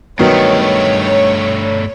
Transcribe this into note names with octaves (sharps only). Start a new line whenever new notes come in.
G2 D#3 F#3 A3 B3 C#5